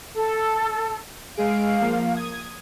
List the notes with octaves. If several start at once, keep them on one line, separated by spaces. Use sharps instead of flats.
A4
G#3 G#4 F5 D7
F3 A#3
D#6 G#6